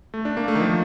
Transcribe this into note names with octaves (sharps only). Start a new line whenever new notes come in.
A3
D4
A#3
A3
D#3
F3